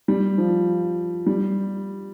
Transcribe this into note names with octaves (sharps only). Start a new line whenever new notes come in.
G3
F3
G3